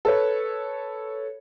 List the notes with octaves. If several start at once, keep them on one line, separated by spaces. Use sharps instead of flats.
A4 B4 C#5